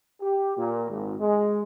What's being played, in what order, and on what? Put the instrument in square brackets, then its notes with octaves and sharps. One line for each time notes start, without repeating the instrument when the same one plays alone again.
[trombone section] G4
A#2
G#1
G#3